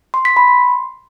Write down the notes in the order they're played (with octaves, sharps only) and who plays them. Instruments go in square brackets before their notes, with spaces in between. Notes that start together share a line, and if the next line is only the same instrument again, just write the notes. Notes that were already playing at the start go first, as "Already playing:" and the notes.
[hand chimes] C6
B6
B5
C6